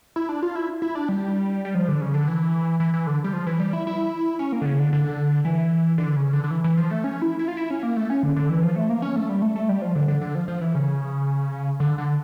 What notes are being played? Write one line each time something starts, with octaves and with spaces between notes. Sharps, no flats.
E4
D4
F4
E4
E4
D4
G3
G3
F3
D3
C#3
D3
E3
E3
E3
D3
G3
F3
E3
G3
E4
E4
C#4
A#3
D3
C#3
D3
D3
E3
D3
C#3
D3
D3
E3
E3
F3
A3
C#4
E4
E4
F4
E4
C#4
A#3
A3
C#4
D3
D3
E3
F3
A3
A#3
C#4
A3
G3
A3
A3
G3
F3
D3
D3
D3
F3
F3
E3
C#3
D3
D3